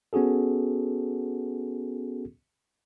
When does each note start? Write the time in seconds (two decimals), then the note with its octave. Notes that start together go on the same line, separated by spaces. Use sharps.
0.13 B3 C#4 F#4 G#4 A4